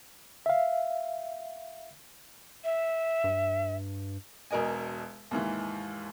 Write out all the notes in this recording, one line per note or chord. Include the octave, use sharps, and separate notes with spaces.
E5 F5
E5
G2
E1 B2 A#4 D#5 G#5
D#2 G#2 E3